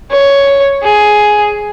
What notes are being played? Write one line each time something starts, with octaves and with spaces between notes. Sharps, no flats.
C#5
G#4